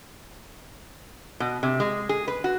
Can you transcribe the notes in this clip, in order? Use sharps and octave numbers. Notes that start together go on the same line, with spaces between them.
B2
C3
G#3
G#4
B4
F#4